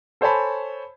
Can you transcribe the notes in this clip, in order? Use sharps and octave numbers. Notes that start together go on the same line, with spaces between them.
A4 C5 C#5 G#5 A5 B5